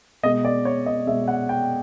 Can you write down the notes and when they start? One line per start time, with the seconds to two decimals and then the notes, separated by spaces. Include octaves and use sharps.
0.23 B2 G#3 D#5
0.45 D5
0.65 C#5
0.86 D#5
1.07 B2 G#3 E5
1.28 F#5
1.49 G5